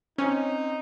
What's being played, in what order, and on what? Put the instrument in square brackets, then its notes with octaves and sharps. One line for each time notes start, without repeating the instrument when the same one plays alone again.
[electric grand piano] C4 [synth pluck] C#4 [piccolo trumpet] D#4